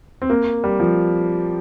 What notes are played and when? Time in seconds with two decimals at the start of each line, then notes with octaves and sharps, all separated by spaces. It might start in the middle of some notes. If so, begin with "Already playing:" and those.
0.22 C4
0.30 A#3
0.64 G3
0.80 F3